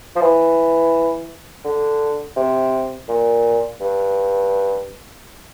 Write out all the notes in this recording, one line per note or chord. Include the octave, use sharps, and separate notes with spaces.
F3
E3
D3
C3
A#2
G2